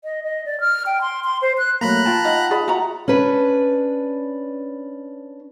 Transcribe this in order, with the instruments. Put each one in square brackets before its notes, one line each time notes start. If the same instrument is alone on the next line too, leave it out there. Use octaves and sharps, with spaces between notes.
[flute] D#5
D#5
D5
F6
G5
C6
C6
C5
F#6
[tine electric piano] F#3 A3 A#3 [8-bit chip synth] A#5 B5 F#6
[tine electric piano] F4 G5 A5
[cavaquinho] D#4 F5 F#5
[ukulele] G#4 D5 B5
[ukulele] F#4 E5 A#5 [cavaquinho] F#5
[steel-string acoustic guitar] C#4 D4 B4